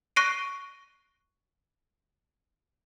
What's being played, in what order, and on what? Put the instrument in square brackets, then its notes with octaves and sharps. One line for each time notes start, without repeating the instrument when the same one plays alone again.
[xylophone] C#6 F#6 A#6 C7 D7 D#7